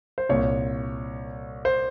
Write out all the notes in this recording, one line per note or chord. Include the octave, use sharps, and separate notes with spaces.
C5
C2 A#2 C#5
C5